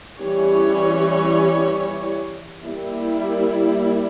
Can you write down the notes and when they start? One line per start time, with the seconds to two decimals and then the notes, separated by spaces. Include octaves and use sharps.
0.18 E3 G3 C#4 G4 C#5
2.61 G3 A#3 E4